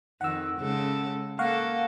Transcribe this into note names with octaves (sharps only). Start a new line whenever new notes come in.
F2 D#3 F#5 E6
C#3 G#3 A4
A#3 A4 F5 F#5 C#6